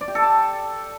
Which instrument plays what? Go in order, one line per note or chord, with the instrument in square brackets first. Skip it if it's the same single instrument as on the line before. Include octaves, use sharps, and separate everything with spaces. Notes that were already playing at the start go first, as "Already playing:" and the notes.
[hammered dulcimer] D5
G4
A4
A5